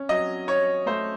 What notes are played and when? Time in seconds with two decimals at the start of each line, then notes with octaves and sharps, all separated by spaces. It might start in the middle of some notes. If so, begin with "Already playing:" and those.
Already playing: C#4
0.09 F#3 D#5
0.47 C#4 C#5
0.86 A3 C5